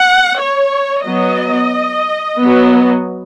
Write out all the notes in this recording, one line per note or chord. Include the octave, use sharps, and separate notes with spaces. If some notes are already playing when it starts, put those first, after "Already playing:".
Already playing: F#5
C#5
F#3 B3 D#5
B3
F#3